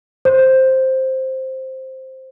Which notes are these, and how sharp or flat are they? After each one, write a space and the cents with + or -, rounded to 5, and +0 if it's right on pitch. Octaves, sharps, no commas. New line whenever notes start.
C5 +5